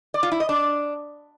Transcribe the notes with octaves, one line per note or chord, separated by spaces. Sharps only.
D5
F4
E4
D#5
D4